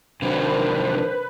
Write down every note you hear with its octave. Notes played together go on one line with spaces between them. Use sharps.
C3 D#3 F3 F#3 D4 B4 C5